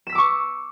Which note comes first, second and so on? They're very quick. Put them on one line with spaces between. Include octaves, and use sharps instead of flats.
E7 B6 E6 D6 C#6